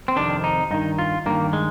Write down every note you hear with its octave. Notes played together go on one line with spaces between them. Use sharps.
C4
F2 C3 D#3 D4
D#4
G2 D#3 D#4
F4
G2 D#3 A#3
G#3